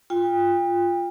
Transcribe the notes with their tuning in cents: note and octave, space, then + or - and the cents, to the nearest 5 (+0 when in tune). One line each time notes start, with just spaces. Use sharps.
F4 +0 G5 +35